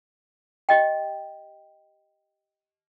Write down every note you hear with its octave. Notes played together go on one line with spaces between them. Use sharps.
G4 D#5 G5